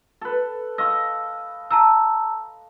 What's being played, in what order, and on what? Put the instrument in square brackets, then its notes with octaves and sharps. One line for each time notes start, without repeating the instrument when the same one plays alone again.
[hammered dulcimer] A4 B4
[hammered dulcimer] D#5 F5 C#6 [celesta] E6
[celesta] A5 A#5 E6